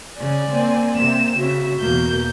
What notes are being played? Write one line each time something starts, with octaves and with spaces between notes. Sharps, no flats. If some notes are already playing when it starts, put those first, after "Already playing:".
C#3 D5 G#5
A#3 C4
C3 C4 E7
C#3 F#4 E5
E2 B2 A#3 G6